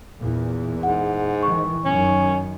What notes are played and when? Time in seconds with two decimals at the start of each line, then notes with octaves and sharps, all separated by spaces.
0.19 E2 A#2
0.83 G#2 F#5
1.43 D#3 E3 C#6
1.85 F#2 D#3 C#4